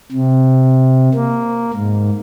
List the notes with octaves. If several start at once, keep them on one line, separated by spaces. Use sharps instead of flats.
C3
A#3
G#2